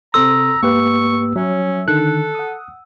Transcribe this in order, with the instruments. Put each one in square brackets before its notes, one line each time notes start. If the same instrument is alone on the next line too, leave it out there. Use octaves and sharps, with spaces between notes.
[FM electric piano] C3 C4 D#6 [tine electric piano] A4 C6 [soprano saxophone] A#5 [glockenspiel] E6
[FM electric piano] G#2 [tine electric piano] A#3 G4 B4 [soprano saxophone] C#6
[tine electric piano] F#3 [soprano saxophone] C#4 [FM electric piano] E5
[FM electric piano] D3 D#3 [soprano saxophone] A4 [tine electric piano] F#6
[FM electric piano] F#5 D#6